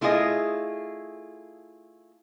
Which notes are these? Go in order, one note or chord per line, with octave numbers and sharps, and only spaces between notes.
A3 E4 F4 G#4 A4 D#5